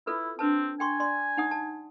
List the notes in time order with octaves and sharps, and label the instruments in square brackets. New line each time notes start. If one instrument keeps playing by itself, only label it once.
[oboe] E4 [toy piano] F4 A4 B4
[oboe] C4 [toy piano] D4 B4 A5
[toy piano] G5 C6 C#6 [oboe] G#5
[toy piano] D5 C6
D#4 F#5 D#6
A5